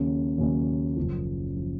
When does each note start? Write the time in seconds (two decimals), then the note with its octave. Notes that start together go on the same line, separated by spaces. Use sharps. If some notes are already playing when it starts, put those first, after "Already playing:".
Already playing: D#2 C#3 F#3 A#3 C#4
0.38 D#2 C#3 F#3 A#3 C#4
0.97 F#1 F#2 F3
1.56 F3